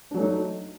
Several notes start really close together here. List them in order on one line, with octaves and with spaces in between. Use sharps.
D4 F#3 A3 D#4